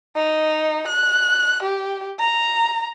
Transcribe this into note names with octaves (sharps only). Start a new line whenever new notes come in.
D#4
F#6
G4
A#5